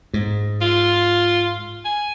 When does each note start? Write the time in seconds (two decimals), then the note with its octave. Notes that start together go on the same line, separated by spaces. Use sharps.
0.14 G#2
0.61 F4
1.85 G#5